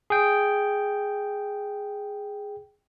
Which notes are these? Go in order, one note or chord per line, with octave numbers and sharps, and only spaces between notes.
G#4 G5